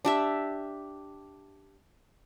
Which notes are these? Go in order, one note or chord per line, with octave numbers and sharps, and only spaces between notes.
D4 G4 E5